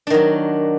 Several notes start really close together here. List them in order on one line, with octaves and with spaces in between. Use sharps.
D4 D#3 F#3